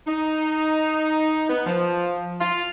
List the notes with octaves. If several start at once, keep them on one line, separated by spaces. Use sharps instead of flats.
D#4
B3
F3
F4